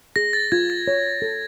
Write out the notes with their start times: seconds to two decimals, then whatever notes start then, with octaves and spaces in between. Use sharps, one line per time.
0.16 G#4 A#6
0.33 A6
0.52 F4 G#6
0.70 A6
0.88 C#5
1.22 A4